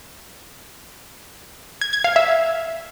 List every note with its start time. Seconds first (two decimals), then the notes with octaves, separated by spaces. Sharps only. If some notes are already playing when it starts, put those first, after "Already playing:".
1.81 G#6
1.93 G#6
2.04 F5
2.16 E5